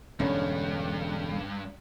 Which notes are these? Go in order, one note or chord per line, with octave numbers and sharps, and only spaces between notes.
E1 G2 D3 C#4 D4